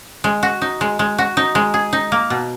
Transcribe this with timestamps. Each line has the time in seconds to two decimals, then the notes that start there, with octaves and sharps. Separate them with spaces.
0.24 G#3
0.43 F#4
0.62 D#4
0.81 G#3
0.99 G#3
1.18 F#4
1.37 D#4
1.55 G#3
1.74 G#4
1.93 D#4
2.12 A#3
2.30 B2